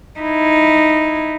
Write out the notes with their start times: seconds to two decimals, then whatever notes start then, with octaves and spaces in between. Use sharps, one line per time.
0.20 D#4 E4